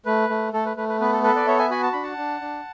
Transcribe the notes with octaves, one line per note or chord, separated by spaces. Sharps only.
A3 B4
A3
A3 A4
B4
A3 B4
B4
B3 B4
A4
A4 B4
B4 D5
B3 C#5 E5
E5 G#5
F#4 G#5 B5
A5
D4 B5
F#5 A5
D4
D4